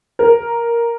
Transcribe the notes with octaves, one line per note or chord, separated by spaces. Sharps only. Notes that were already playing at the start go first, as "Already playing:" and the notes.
A#4